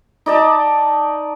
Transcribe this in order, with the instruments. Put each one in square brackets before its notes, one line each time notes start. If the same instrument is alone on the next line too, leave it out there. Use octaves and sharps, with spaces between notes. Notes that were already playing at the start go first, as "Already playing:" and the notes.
[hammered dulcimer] D#4 D5 A5